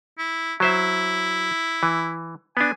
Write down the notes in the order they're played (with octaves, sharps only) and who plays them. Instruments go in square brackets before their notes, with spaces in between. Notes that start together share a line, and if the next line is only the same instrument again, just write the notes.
[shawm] E4
[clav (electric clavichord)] F#3 C5 E5 [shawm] E4
[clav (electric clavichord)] E3
[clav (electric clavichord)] B3 D4 [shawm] G#5